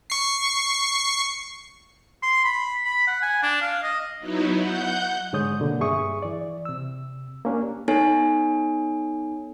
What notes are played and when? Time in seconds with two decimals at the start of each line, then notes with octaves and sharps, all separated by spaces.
0.10 C#6 C7
2.23 C6
2.44 B5
2.85 B5
3.07 F#5
3.22 G#5
3.43 D4
3.62 F5
3.83 D#5
4.19 F#3 B3 D#4 E4
4.58 F#5 G6
5.33 G#2 D3 G#3 C#5 D#6 G6
5.60 B2 D3 A#3
5.81 G2 G#4 E5 C#6 D#6
6.22 E3 D5
6.65 C3 E6
7.45 A#3 C#4 D4 G4
7.88 B3 D#4 A4 C#5 G#5